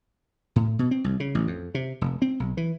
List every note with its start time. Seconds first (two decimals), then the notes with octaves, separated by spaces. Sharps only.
0.56 A2
0.79 B2
0.91 C4
1.04 C2
1.20 C#3
1.35 A1
1.47 F2
1.75 C3
2.01 F1
2.22 C4
2.40 B1
2.57 E3